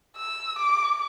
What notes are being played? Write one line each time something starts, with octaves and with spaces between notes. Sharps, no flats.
E6
D6